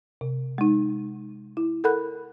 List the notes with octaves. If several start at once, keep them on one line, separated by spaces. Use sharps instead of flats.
C3
G#3 D#4
E4
A4 A#4 F#5 B5 F#6